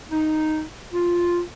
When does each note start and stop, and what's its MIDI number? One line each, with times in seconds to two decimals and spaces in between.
0.11 0.61 63
0.93 1.39 65